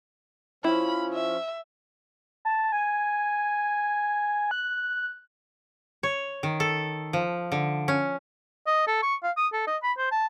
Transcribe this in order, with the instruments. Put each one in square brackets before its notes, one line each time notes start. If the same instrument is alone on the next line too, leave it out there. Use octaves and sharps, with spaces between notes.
[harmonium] F3 C#4 [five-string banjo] E4 [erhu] B5
[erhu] E5
[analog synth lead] A5
G#5
F#6
[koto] C#5
D#3
A4
F3
D3
C#4
[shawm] D#5
A4
C#6
F5
D#6
A4
D#5
B5
C5
A5